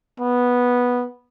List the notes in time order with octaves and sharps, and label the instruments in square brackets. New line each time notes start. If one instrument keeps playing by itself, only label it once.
[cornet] B3